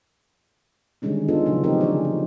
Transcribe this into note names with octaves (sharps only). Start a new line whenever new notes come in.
D3 D#3 G3 G#3 C#4 D#4
B3 D4 D#4 F4 G#4 A4
A#2 C#3 F3 F#3 D4
A3 C4 D#4 G4 G#4 A#4
D3 E3 D4 G#4 C#5
F3